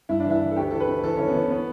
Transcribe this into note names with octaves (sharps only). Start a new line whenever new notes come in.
G2 E4
D4
E3 E4
E3
A4
D2 G4
E3 A4
B4
D2
E3 A4
E3 C#4
B3
E3
B3